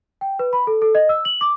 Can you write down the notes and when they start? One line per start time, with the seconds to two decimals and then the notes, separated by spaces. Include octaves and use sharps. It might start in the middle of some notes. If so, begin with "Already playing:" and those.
0.21 G5
0.39 B4
0.53 B5
0.67 A4
0.82 A4
0.95 D#5
1.09 E6
1.25 F#7
1.41 D6